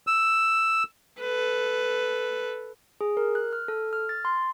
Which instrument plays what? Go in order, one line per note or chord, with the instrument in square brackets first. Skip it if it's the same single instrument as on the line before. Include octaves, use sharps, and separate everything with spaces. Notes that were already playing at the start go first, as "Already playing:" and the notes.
[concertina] E6
[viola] A4 B4
[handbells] G#4
A#4
F#6
F6
A4
F6
A6
C6